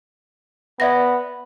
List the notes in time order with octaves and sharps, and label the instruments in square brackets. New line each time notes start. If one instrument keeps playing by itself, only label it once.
[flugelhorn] B3 [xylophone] D5 E5 A#6